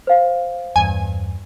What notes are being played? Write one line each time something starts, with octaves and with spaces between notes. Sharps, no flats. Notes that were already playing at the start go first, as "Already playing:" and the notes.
C5 F5
E2 G2 G#5